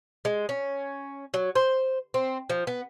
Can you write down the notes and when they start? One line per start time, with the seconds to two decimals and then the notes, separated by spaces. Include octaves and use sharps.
0.25 G#3
0.49 C#4
1.34 F#3
1.55 C5
2.14 C4
2.50 F3
2.67 B3